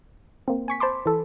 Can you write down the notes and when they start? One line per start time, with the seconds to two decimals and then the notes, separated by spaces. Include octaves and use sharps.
0.48 A#3 C4
0.68 G#5 C#6 B6
0.80 C5 A5 B5 C6 D6
1.06 E3 A4